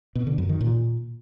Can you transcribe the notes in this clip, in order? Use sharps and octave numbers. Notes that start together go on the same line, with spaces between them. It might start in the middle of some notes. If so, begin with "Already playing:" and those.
B2
D3
F#2
D#3
A#2